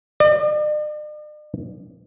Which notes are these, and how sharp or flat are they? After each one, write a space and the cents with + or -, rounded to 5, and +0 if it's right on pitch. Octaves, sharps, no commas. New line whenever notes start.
D5 +45